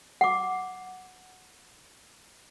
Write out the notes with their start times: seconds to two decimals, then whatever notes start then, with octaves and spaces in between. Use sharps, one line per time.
0.21 F#5 D6